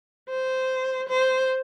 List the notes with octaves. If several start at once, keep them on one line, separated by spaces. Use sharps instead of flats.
C5
C5